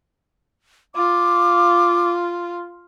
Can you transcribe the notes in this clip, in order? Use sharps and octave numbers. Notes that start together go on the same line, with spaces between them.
F4 D6